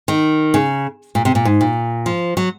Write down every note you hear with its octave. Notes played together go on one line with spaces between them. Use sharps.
D#3
C#3
A#2
C3
A#2
G#2
A#2
F3
F#3